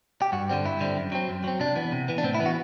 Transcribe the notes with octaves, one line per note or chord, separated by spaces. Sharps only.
G4
G2 F#4
D3 G3 C4
G2 E4
D3 G3 C4
F#2
F#3 C4
F#2
F#3 C4
C3 D4
E3 B3
C3
E3 B3
D4
A2 C4
E4
E3 B3
F#4